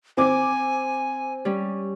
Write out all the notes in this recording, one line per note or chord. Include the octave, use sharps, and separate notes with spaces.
C4 G#5 D6
G3 C#4